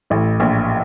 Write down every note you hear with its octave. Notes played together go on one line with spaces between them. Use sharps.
A1 A2
A#1 A#2